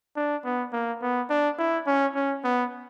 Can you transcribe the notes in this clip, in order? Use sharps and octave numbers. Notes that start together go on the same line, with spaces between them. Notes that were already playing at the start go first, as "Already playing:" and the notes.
D4
B3
A#3
B3
D4
E4
C#4
C#4
B3